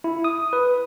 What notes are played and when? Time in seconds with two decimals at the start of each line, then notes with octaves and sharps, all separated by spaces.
0.04 E4
0.24 D#6
0.53 B4